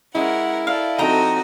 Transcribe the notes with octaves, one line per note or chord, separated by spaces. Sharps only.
G#3 C#4 E4 A#4 F#5
A4 D5 F5
F3 C4 D#4 F#4 A4 D#5 G5 A#5